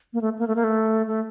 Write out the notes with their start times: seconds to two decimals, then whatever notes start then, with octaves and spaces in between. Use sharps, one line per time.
0.13 A#3
0.21 A3
0.39 A#3
0.47 A3
0.56 A#3
0.64 A3
1.07 A3